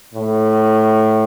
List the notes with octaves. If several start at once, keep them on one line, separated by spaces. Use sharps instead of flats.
A2